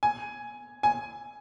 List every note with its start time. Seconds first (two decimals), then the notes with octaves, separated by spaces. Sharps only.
0.03 G#5
0.83 G#5